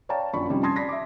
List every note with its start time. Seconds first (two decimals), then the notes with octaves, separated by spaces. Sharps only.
0.09 C#5 D5 F5 G5 A5 A#5
0.33 A#1 F#2 A#2 D5 B5 C#6
0.49 C3 F3 G3 C#4 D#4
0.63 A5 C6 D#6 G#6 A#6 C7
0.76 D5 B5 A#6 B6
0.89 E5 D6